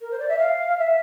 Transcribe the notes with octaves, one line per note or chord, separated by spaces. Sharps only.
A#4
C5
D5
E5
F5
E5